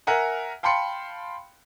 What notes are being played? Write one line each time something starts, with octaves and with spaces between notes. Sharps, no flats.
A#4 E5 F#5 G#5
F5 G5 A5 B5 C6 C#7